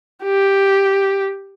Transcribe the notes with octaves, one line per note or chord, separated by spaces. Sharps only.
G4